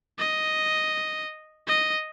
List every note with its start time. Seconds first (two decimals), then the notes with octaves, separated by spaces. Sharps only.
0.19 D#5
1.67 D#5